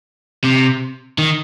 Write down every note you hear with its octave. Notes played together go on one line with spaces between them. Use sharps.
C3
D#3